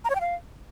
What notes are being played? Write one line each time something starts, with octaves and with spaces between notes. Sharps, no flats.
A#5
C#5
G5
F5